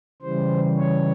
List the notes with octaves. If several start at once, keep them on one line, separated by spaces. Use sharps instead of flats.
C#3 E3 G3 C5
C#5